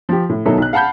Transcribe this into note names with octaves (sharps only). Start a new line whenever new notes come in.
F3 G4
A2
B2 D#3 F#3 D#4 E4 A4
B1 F#6
F5 F#5 A5 B5 G6